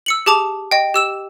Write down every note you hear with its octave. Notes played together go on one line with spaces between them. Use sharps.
E6 C#7 F#7
G4 G#4 A5 D6 F7
D#5 G5
G4 E6 E7